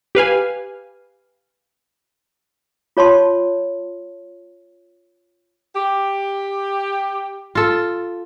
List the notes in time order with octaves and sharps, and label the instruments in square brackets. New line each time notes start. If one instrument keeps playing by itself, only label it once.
[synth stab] G4 B4 F5 G#5
[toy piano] F4 C#5 A5 C6
[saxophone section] G4
[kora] F4 A4